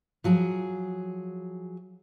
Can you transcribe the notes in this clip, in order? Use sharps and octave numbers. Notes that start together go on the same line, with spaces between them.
F3 F#3 G#4